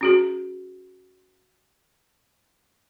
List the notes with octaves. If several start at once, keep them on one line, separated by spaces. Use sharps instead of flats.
C#4 F#4 G#4